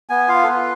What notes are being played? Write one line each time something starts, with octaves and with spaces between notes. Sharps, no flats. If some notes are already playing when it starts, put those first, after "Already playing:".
B3 G#5
F4 F5
A4
F4 B4